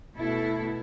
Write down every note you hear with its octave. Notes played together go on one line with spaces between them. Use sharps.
B2 A3 E4 A4